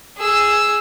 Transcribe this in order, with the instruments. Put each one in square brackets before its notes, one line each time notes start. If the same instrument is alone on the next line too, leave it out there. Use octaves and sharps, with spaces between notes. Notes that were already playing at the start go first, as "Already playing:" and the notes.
[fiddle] G#4 E6